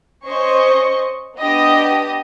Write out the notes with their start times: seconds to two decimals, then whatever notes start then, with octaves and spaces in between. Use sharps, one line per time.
0.25 C#4 C5 D#5 C#6
1.37 B3 D4 G4 D#5 D#6